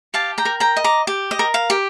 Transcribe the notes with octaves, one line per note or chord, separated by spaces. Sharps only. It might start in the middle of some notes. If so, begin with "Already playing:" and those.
G4 F5 A5
G5 A#5
A#4
G5 A#5
D#5
A#5 D6
G4
D#5
A#4
F5
G4